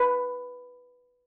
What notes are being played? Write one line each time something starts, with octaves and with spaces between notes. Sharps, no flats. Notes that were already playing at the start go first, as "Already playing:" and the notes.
Already playing: B4